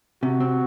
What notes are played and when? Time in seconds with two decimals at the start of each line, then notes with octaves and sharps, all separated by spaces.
0.22 C3 F#4
0.40 C4